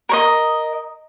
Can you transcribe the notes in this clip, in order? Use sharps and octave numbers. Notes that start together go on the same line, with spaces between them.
A#4 C#5 D#5